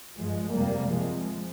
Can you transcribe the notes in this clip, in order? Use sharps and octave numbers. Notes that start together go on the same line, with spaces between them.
G2 F3 G#3
F2 C3 G3 A#3
F2 C3 F3 G#3